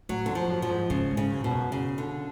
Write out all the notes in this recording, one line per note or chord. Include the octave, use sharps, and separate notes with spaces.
A2 F#3
F#2 D3
F3
F2
F#2
F3
G#2
G#2 C#3
G#2
C#3
F#2
F2 B2
F#2
C#3
D3